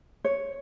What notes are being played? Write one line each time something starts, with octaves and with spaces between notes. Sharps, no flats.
C#5